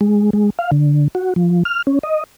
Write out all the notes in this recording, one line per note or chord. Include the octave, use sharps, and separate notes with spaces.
G#3
G#3
F5
D3
F#4
F3
F6
C#4
D#5